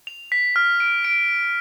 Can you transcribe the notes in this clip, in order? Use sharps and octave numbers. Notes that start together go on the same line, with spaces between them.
F7
B6
F6
D7
D7